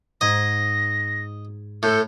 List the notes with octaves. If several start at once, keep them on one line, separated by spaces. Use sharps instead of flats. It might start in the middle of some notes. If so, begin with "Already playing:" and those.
G#2 D#5 G#6 A#6
A2 A4 G6